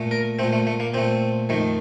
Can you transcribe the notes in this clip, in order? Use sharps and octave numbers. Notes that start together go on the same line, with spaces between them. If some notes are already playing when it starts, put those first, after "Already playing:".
Already playing: A#2 A3
A#4
A#2 A3 C4
A3
A3
A#3
A#2 A3 C4
F2 D#3 A3